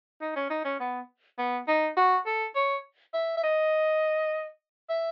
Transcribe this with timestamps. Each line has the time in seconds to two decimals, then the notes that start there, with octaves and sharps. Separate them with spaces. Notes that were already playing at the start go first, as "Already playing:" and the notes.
0.21 D#4
0.36 C#4
0.50 D#4
0.64 C#4
0.79 B3
1.38 B3
1.67 D#4
1.97 F#4
2.26 A4
2.55 C#5
3.14 E5
3.37 E5
3.43 D#5
4.90 E5